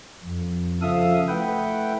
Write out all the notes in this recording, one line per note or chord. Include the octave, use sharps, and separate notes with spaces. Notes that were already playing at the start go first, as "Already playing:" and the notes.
F2
C#3 F3 A4 E5 F5 D#6
A3 E4 B4 F#5 G5